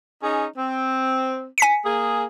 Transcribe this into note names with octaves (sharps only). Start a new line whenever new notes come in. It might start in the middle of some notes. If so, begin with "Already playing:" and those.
C#4 D#4 G#4
C4
G#5 B6 C#7
A#3 G#4